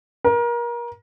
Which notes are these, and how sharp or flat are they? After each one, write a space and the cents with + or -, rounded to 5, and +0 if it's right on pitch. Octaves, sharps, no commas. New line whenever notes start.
A#4 +30